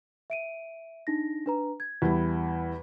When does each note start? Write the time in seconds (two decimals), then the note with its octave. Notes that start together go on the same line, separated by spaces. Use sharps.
0.30 E5 D7 D#7
1.07 D4 D#4 A#6
1.46 D4 B4 A#5
1.80 G#6
2.02 E2 G3 E4